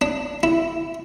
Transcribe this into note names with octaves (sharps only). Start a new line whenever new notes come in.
D4
E4